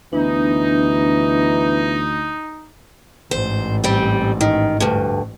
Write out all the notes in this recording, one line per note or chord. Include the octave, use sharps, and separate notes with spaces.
D2 E3 B3 D4 D#4
A1 G#2 C5
G3 C4
D#3
D2 G2